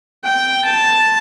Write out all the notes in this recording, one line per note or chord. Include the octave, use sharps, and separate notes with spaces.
G5
A5